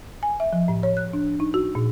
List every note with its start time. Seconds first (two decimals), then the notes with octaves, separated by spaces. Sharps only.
0.23 G#5
0.40 E5
0.53 F3
0.68 A2
0.83 C#5
0.97 F#6
1.13 D4
1.40 D#4
1.54 F#4
1.75 A#2